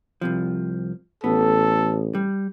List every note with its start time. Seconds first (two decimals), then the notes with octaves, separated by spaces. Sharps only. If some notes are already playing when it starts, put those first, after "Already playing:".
0.21 C2 C3 F3
1.24 A1 B3 A4
2.15 G3